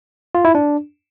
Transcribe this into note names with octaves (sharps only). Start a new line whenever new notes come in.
F4
E4
D4